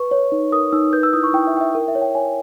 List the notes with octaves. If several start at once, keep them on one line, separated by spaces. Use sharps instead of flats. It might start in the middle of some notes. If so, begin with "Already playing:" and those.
Already playing: B4 C#6
C#5
D#4
A#4 D#6
D#4 E6
B4 G6
E6
E4 D#6
C#6
E4 G5
E5
E4 G5
E5
A#4 G5
E5
C#5
G5
C#5 G#5